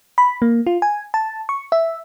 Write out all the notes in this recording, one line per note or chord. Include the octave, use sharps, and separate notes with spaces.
B5
A#3
F4
G#5
A5
C#6
E5